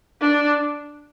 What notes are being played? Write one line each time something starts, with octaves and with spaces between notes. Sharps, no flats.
D4